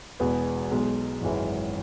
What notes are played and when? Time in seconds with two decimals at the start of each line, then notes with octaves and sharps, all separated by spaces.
0.20 E1 E2 B2 B3 G#4
0.71 B1 B2 G#3
1.22 G#1 F#2 E3 G#3 E4